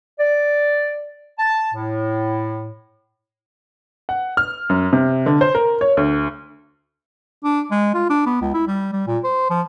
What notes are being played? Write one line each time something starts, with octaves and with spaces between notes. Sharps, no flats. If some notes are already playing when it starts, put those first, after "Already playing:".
D5
A5
A2
F#5
F6
F#2
C3
D3
C5
A#4
C#5
D2
D4
G#3
F4
D4
B3
C#2
E4
G3
G3
A#2
C5
F3